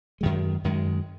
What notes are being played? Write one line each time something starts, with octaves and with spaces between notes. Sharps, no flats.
F#2 D#3 G#3
F#2 D#3 G#3